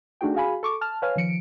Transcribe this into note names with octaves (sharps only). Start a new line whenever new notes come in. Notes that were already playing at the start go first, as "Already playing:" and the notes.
A3 D4 D#4 F#4 G#4 G5
F#4 G#4 F5 G#5 B5
A4 C#6 D6
A5 F6
B4 C#5 F5 G#5 F6
D#3 F3 C#7 D7